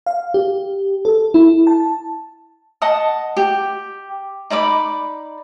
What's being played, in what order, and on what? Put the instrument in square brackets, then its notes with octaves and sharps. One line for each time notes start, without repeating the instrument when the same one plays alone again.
[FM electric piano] F5
G4
A4
E4
A5
[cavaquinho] D#5 F#5 A5 D#6
G4
D#4 D5 B5 D6